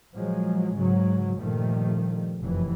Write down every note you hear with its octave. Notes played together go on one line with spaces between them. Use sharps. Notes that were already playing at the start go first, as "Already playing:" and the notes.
A#2 F3 F#3 G#3
G#2 C#3 F#3
G2 A#2 D#3 F3 G3 A3
F1 F#2 E3